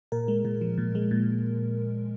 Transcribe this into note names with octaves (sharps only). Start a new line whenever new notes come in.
A#2 A#4
G#3
A#2
F3
A#2
G#3
A#2